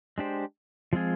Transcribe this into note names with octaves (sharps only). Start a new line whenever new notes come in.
G#3 D4 G4 C5
F3 G#3 C4 F4 G#4